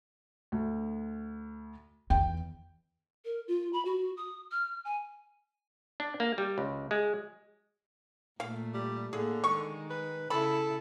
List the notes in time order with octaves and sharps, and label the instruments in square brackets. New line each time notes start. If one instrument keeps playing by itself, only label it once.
[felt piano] D2
[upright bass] E2 [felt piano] G5
[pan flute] A#4
F4
B5
F#4
D#6
F6
G#5
[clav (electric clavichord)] D4
A#3
G3
C#2
G#3
[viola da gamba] A#2 A3 [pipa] F5
[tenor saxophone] G3
[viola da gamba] A2 A#3 [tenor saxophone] D3 [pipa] G#4
[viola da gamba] D#3 G#3 [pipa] C#6
[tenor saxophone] B4
[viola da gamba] C#3 E4 [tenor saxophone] A4 [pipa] B5